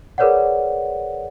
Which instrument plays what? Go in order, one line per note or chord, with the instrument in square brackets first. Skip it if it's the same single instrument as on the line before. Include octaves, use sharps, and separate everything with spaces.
[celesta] G#4 A#4 B4 C#5 D5 F#5